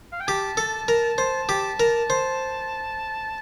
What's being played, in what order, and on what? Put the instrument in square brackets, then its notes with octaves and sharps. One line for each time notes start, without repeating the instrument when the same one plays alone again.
[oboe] F5
G5
[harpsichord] G4 [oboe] A5
[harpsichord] A4
A#4
C5
G4
A#4
C5